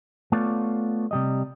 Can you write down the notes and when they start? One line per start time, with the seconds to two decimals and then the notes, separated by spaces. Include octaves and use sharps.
0.32 A3 B3 F4 C#5 D5
1.11 C3 G3 D#5